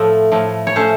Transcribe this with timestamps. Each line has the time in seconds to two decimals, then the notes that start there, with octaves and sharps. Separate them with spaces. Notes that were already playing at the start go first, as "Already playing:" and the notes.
Already playing: A2 F3 A3
0.32 A2 F3 A3
0.67 C#5
0.76 F3 A3 C#4 C5